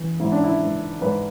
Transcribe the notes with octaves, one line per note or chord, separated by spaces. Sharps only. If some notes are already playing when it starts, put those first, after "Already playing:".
Already playing: E3
G#2 E4
D4
E4
G#2
G#2 B4